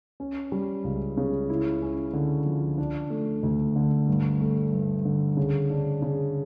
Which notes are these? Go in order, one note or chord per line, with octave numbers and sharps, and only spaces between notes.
C#4
G3
C#2
C#3
E4
C#4
D3
F3
D4
A3
D2
D3
G2
A3
G2
D3
C#3
D4
C#3